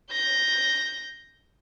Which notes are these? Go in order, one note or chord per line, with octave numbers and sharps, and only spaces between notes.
G6 A#6